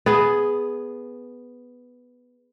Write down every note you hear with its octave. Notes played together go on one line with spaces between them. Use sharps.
B3 G#4